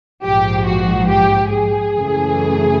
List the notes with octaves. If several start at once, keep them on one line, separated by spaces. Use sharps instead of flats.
A#1 G#2 F3 G4
F#4
G4
G#4
F#2 C#3 E3 A3